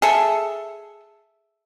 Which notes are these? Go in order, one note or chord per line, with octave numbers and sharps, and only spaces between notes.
G#4 A4 E5